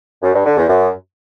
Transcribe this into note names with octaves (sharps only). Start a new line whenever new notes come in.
F#2
G2
D3
E2
F#2